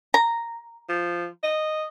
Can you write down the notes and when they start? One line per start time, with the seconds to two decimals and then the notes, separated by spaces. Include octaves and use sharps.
0.14 A#5
0.89 F3
1.43 D#5